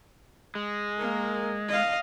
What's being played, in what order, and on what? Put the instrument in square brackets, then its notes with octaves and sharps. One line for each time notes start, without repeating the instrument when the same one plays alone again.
[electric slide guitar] G#3
[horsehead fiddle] A#3 A#4
D#5 F5